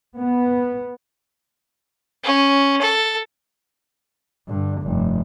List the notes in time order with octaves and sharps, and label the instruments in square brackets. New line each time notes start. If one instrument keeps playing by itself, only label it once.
[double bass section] B3
[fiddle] C#4
A4
[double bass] G2 D3
F1 G2